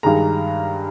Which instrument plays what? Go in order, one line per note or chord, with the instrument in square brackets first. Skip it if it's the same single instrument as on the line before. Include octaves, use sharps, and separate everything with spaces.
[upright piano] G2 D#3 G#3 A#5